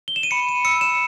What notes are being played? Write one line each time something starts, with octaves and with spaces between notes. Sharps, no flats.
G7
E7
D#7
B5 C#7
D#7
E6 C#7
E7